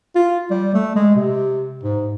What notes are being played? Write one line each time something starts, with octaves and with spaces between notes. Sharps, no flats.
F4
G3
A3
G#3
C3
G#2